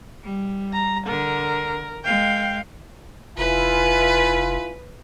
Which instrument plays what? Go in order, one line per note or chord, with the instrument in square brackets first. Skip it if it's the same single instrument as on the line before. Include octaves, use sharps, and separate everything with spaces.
[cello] G3
[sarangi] A#5
[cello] D3 [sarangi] A#4
[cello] G#3 F5 [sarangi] G5
[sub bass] F1 [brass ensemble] E4 F4 G#5 [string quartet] B4